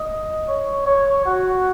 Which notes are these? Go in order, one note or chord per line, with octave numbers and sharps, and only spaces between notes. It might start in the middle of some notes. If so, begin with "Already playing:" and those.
Already playing: D#5
C#5
C#5
F#4